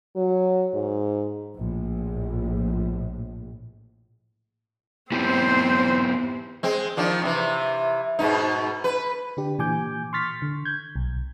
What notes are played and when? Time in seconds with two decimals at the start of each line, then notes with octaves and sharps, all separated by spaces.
0.16 F#3
0.74 G#2
1.56 A#1 A2
5.12 B3 C4 E4 G4 C5
6.63 G#3 C4
6.97 D#3 F3 D4
7.22 C3 E3
8.19 G#2 B2 D#4
8.84 B4
9.37 D3 D4 G4
9.59 A#2 E3 G#5 D6 G6
10.13 C6 C#6 F6 A6 B6
10.42 D3
10.65 G6 G#6
10.96 B1